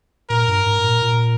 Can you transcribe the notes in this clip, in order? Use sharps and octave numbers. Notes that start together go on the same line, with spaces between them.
A#2 A#4
G2
G#2
A#2
A#2